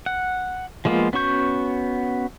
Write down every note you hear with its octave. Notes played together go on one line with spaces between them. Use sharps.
F#5
F3 G#3 A#3 B3 F4
B3 C#4 F#4 C#6 G6